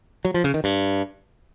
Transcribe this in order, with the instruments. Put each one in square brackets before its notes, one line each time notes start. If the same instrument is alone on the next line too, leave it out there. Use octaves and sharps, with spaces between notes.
[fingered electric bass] F#3
F3
C#3
D#3
G2